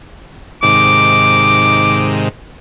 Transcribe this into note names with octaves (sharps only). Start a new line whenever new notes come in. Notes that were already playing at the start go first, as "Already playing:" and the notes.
G#2 C3 D#3 D6